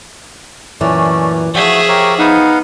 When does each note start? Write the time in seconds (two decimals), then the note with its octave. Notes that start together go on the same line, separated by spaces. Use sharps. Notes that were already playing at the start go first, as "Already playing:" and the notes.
0.81 F#2 A#2 E3 A3 C#4 D5
1.55 F3 A3 F#4 G#4 E5
1.88 G4 A#4 C#5
2.19 B3 D#4 F5 F#5